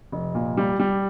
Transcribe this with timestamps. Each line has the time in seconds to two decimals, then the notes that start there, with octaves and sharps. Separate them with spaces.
0.12 F1
0.35 A#2
0.57 G3
0.79 G3